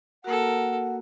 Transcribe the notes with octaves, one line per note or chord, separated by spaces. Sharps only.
A#3 F#4 A4 A#4 F#5